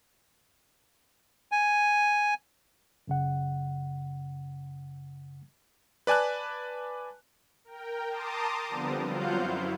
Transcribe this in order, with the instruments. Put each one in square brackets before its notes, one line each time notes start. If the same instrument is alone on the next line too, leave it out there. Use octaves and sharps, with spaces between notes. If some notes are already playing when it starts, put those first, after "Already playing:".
[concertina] G#5
[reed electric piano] F#2 C#3 F#5
[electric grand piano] B4 D5 G#5 A5 F#6
[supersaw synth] A#4 G5
A5 A#5 C6 D6 D#6
D3 F3 G3 B3 C4
F#3 F4 C5 F5 F#5 G6
F#2 E4